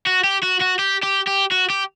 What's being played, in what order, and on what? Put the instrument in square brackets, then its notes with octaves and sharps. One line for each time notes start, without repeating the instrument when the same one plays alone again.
[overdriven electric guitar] F#4
G4
F#4
F#4
G4
G4
G4
F#4
G4